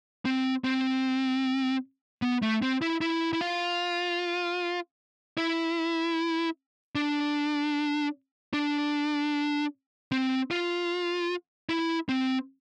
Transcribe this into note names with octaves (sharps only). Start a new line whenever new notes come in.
C4
C4
B3
A3
C4
E4
E4
E4
F4
E4
D4
D4
C4
F4
E4
C4